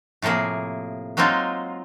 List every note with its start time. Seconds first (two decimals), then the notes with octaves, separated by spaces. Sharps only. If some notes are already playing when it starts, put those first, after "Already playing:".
0.22 A2 C3 F3 A#3 G#4
1.17 F#3 G#3 C4 D#4 F4